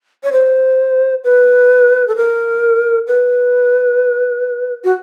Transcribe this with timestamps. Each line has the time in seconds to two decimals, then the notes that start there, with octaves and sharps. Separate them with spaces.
0.24 C#5
0.32 C5
1.24 B4
2.08 A4
2.16 A#4
3.07 B4
4.84 F#4